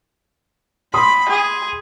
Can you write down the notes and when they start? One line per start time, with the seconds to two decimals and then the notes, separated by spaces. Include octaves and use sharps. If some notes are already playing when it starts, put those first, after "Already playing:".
0.94 B5 C6 D#6
1.29 G#4